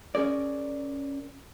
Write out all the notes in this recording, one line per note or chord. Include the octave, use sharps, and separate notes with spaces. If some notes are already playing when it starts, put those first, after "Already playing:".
C#4 G#4 A#4 D5